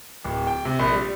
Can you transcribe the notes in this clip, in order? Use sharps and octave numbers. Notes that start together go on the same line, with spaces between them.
D1
G5
C3
A#1
G3